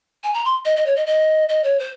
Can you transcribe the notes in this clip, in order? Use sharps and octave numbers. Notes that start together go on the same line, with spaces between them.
G#5
A#5
C6
D#5
D#5
C#5
D#5
D#5
D#5
C#5
C5